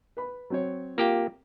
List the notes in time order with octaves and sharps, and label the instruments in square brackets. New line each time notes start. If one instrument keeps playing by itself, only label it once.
[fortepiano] B4 B5
F#3 C4 C#5
[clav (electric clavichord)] A#3 G4 G5 [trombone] F4